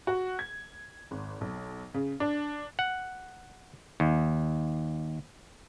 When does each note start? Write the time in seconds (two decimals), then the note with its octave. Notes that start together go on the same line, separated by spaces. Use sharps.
0.07 F#4
0.39 G#6
1.11 G#1
1.41 B1
1.94 C#3
2.20 D4
2.79 F#5
4.00 D#2